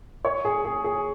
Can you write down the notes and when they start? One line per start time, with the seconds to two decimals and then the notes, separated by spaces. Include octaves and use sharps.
0.25 C#5
0.45 G#4
0.65 G#4
0.84 G#4